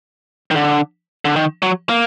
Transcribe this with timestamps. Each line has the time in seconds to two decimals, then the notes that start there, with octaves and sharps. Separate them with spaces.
0.51 D#3
0.56 D3
1.25 D3
1.36 D#3
1.62 F#3
1.89 A#3